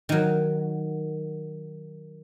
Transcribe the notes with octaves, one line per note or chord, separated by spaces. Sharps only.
D#3 F#3